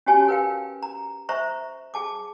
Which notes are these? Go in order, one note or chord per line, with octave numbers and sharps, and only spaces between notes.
C#4 F#4 G4 C#5 G#5 A5
A#4 B4 F5 G5
A#5
C5 E5 A#5 C#6
G#4 A5 D6